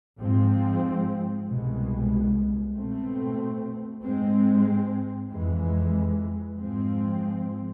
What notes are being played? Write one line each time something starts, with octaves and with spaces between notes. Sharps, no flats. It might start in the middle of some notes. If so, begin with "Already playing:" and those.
G#2 F3 G#3 C4
C2 B2 G#3
B2 A3 C4
G#2 G#3 C4
F2 E3 G#3
G#2 F3 G#3 C4